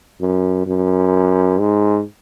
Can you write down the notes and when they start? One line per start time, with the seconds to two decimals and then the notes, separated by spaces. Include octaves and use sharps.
0.21 F#2
0.66 F#2
1.59 G#2